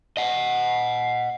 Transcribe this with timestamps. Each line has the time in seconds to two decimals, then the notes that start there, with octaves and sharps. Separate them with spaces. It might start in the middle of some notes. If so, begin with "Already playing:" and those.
0.17 D#5 F#5